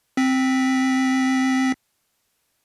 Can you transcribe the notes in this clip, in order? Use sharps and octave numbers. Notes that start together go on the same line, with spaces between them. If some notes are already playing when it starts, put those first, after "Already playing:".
C4 B6